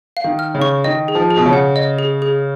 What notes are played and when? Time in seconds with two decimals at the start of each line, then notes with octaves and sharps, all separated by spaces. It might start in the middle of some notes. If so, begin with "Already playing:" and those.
0.17 F5
0.24 D#3
0.39 F6
0.55 C#3
0.62 C#6
0.84 D#3 D#5
1.08 G#4
1.15 F3
1.31 G#4
1.37 B2
1.46 C#3
1.53 F#5
1.76 D#5
1.99 G#4
2.22 G#4